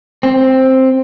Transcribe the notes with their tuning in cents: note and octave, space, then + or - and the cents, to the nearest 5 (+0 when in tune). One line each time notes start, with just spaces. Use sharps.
C4 +5